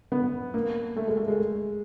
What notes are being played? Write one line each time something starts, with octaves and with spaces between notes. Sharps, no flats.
B3
A#3
A3
G#3
A3
G#3